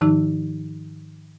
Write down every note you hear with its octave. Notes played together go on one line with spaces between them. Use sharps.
G#2 D#3 F3 D#4 E6